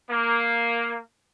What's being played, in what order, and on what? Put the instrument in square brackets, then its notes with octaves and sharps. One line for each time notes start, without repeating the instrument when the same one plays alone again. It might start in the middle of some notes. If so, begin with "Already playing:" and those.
[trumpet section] A#3